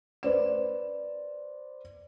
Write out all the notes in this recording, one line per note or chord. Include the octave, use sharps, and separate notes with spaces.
B4 C5 D5 E7